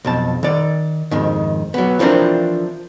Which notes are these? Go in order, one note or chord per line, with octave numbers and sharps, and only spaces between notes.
B1 F2 A5
D#3 D5
F2 G#2 D#3
F#3 B3
E3 F3 C4 D4 A#4